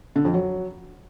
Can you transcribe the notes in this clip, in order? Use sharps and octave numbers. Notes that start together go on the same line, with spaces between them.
D3
F2
F#3